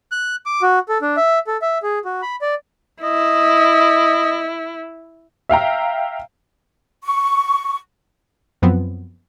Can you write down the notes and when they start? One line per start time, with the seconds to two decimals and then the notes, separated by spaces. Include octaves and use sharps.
0.12 F#6
0.46 D6
0.62 F#4
0.89 A4
1.02 D4
1.17 E5
1.47 A4
1.62 E5
1.83 G#4
2.05 F#4
2.22 B5
2.42 D5
3.03 E4 D#5
5.49 E5 F5 G5 A#5
7.03 C#6
8.62 F#2 F3 B3 C4